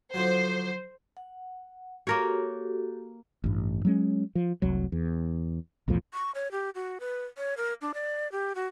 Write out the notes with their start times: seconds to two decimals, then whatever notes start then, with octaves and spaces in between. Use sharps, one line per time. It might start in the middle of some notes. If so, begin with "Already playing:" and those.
0.14 D3 F3 F#3 C5
1.17 F#5
2.07 A#3 F#4 G4 A4 A#4 C#5
3.44 A1 G2
3.85 F#3 G#3 C#4
4.35 F3
4.62 F1 C2 F#3
4.92 E2
5.88 B1 E2 A2 F3
6.13 C#6
6.35 C#5
6.52 G4
6.75 F#4
7.00 B4
7.37 C#5
7.57 A#4
7.81 D4
7.94 D5
8.32 G4
8.55 F#4